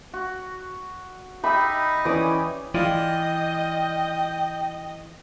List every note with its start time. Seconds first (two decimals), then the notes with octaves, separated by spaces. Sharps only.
0.14 F#4
1.44 D#4 G4 D#5 E5 B5
2.05 E3 C#4 D5 D#6
2.74 E3 F4 D5 D#5 G5